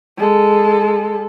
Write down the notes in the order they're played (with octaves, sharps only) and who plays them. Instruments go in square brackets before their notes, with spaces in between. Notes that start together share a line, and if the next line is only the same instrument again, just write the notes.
[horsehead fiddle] G#3 A4